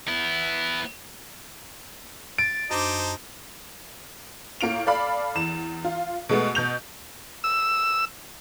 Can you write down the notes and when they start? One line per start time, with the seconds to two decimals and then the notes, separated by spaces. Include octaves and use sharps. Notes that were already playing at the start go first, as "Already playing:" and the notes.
0.08 B3 E4
2.38 A6 D7
2.71 F#2 D4 D#4 C5 D#5 A5 D6
4.61 A2 A#3 F4 D7 F7
4.87 A4 D5 F5 B5
5.35 E2 E7
5.85 F4
6.29 B2 G#3 A3 B3
6.55 B2 G6 F7
7.44 E6